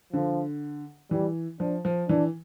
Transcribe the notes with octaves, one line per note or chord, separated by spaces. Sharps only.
D3 F3
E3 G3
F3 D4
F3
E3 D4